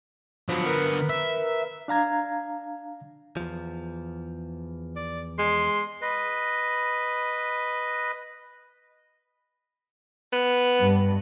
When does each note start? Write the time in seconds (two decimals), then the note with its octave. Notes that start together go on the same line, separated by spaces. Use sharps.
0.49 D3 F3 F#3 B3
0.66 A#4 B4
1.10 E5
1.88 D4 F5 A#5 G#6
3.37 E2 F3
4.96 D5
5.39 G#3 C6
6.02 B4 D#5
10.33 B3
10.81 G2